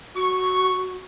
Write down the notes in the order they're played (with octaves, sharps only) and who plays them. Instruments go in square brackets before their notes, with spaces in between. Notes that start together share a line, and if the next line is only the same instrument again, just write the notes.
[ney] F#4 [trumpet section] C#6